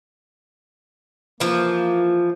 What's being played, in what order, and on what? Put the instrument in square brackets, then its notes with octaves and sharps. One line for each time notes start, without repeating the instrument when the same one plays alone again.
[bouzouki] E3 F3 [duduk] A#3